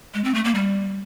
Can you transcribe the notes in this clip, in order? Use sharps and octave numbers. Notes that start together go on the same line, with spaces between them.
G#3
C4
A3
A#3
G3